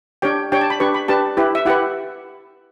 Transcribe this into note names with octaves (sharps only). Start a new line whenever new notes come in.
D4 G4 C#5 G5
D4 G4 C#5 G5
A5
B5
D4 G4 B4 C#6
B5
D4 G4 B4 A5
E4 G4 B4
E5
E4 G4 B4 F#5